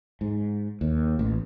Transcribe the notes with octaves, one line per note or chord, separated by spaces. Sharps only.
G#2
D#2
A1